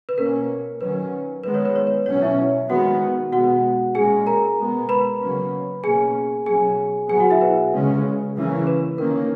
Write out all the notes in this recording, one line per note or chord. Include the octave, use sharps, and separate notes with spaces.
B4
B2 A#3 C#4 A#4
D#3 F#3 C#4 B4
D#3 G#3 B3 B4
C#5
B4
C#5
B4
B2 F#3 C#4 C#5
E4 E5
D#3 G#3 B3 F#4 F#5
B2 G#3 B3 F#4 F#5
A#2 G#3 C#4 G#4 G#5
A#4 A#5
B2 G#3 B3
B4 B5
C#3 F#3 A#3 C#4
B2 A#3 C#4 G#4 G#5
B2 F#3 C#4 G#4 G#5
B2 F#3 B3 G#4 G#5
F#4 F#5
E4 E5
B4
C#3 G#3 C#4
C#3 E3 A#3 C#4
B4
D#3 A#3 C#4 A#4